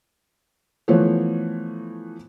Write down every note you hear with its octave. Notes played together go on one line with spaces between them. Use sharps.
E3 F3 A3 B3 C5 C#5